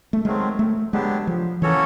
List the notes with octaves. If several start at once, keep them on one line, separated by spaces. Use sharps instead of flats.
A3
D#3 F#3 G#3 A3 C4
A3
D3 F#3 G#3 B3 D4 G4
F3
E3 A#3 C#4 F#4 A4 C#5